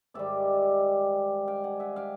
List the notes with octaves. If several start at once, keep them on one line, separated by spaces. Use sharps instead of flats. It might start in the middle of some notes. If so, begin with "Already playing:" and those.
G#2 D#3 G3 D5 E5
F5 G5
F#5 G#5
E5 F#5
F5 G5